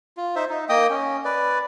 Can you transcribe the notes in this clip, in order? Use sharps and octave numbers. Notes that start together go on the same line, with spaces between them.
F4
D#4 C5 E5
D#4
A#3 D#5 G5 D#6
C#4
B4 D5